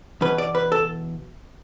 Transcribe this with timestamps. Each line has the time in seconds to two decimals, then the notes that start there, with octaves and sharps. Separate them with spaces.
0.21 E2 B2 B4
0.38 D5
0.55 B4
0.72 A4